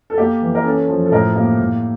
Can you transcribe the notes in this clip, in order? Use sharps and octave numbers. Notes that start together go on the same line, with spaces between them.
A4
A#3 G4
E3
A#4
C#4 A4
F3
A4
A2 A#4
A#3 G4
A2